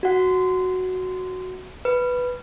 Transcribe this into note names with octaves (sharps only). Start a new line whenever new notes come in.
F#4 F#5
B4